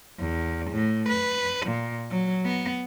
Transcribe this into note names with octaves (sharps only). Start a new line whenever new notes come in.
E2
A2
B4
A#2
F#3
B3